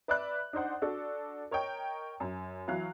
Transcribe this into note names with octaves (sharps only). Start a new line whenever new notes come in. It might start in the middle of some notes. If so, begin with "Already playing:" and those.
B4 D5 E5 B5 F#6
D4 D#4 C5 F#5
D4 F#4 A4
A#4 C#5 D#5 G5
F#2
E3 F#3 F5 F#6